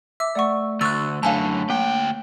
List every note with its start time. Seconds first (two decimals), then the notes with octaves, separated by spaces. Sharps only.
0.20 E5 D6 E6
0.35 A3 D5 F#5 C#6
0.81 D2 C#6 E6 F#6 A6
1.23 F#2 D3 C#5 F5 G#5 A5 B5
1.70 D2 A#3 G5